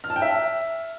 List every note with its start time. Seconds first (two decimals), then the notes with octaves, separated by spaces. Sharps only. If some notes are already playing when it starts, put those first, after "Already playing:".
0.04 F6
0.10 A5
0.16 G5
0.22 E5